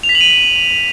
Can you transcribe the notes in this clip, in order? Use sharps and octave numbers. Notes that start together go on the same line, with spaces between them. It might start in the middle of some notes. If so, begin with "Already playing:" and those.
F7
B6
F#7
D#7